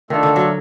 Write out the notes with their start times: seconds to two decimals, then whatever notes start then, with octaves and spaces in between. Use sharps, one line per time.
0.10 D#3 A3 D4 F4 A4
0.23 D3
0.36 F#3